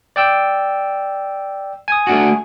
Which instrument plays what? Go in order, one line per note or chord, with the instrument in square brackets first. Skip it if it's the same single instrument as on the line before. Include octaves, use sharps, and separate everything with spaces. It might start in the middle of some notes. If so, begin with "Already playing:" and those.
[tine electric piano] D5 G5 E6
G#5 D#6
[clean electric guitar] A3 D4 F#4